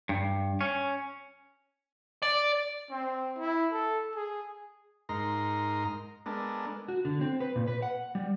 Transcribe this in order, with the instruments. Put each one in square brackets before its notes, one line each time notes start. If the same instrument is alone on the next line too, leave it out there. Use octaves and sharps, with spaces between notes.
[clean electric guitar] G2
C#4
[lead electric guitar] D5
[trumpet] C4
E4
A4
G#4
[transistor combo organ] G#2 D#4 A#4 A#5 C6
G#3 B3 D4 A4 A#4
[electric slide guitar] F#4
D3
C4
B4
A#2
B4
F#5
G3